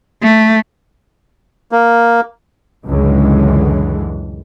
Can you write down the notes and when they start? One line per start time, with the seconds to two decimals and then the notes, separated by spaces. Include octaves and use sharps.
0.23 A3
1.72 A#3
2.86 C#2 F#2 A2 D3 E3 G#3